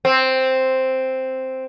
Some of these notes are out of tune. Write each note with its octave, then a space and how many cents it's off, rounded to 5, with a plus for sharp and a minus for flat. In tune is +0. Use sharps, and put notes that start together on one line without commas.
C4 +0